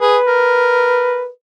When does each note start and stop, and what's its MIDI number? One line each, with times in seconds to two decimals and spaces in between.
0.01 0.17 68
0.01 1.29 71
0.28 1.29 70